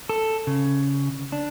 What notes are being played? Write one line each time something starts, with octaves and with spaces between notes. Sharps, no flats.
A4
C#3
D4